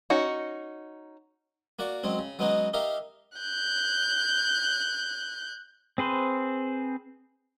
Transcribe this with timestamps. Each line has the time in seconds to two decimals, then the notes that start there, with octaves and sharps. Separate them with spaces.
0.10 C#4 D#4 F#4
1.79 A#3 F#4 D5 C#6
2.04 F#3 G#3 C4 C#4
2.19 C#3
2.39 F#3 G#3 B3 C#4 D#4 F#4
2.73 D#4 G4 A#4 E5 F5
3.38 F#6 G6
5.98 C4 G#4 B4 C5